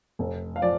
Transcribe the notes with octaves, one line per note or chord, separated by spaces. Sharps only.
F1
F5
F3 D5